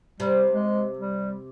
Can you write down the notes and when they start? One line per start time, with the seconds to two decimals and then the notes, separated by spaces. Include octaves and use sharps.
0.20 C3 G3
0.52 G#3
0.98 G3